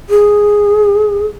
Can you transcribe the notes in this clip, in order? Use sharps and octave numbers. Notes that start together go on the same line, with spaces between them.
G#4